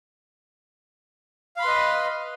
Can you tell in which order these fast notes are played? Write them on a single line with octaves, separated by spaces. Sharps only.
F5 B5 C6 B4 D#5